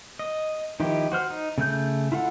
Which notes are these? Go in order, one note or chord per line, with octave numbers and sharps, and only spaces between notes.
D#5
D#3 F3 D#4 E4 G4
F#4 C5 F6
D#4
C#3 A3 G6
E4 F4 A4 F#5